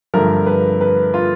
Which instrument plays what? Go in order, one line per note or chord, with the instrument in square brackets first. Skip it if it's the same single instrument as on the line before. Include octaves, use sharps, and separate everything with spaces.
[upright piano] G2 D3 F3 A3 A#4
B4
B4
F4